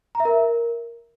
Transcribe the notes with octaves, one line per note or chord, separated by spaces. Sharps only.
A#5
E5
A#4